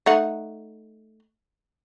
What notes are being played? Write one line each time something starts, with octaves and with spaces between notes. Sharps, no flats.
A3 D#4 F#5